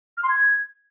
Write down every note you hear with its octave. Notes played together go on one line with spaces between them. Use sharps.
F6
C6
G#6